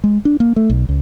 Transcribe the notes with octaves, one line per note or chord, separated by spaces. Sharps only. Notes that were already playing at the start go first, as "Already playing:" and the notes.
G#3
D4
A#3
A3
B1
C#2